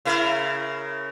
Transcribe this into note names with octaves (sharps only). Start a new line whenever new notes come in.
C#3 E4 A#4